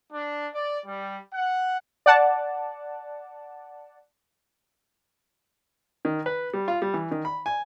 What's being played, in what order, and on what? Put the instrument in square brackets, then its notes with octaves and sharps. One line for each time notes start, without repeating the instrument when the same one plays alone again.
[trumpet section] D4
D5
G3
F#5
[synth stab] D5 F#5 A5
[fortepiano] D#3
B4
G3
F4
G3
E3
D#3
B5
G#5